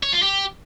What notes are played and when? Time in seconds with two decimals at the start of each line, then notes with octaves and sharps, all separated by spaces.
0.03 C#5
0.13 F4
0.22 G4